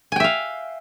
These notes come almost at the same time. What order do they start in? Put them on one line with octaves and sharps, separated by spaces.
G#5 G5 E5 F5